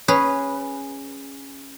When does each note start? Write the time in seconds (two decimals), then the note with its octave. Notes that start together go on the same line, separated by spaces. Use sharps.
0.08 C#4 G#4 B4